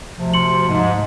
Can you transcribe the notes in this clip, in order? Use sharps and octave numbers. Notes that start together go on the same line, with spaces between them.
D2 C3 F3
C6 C#7 F#7
G#2 G#3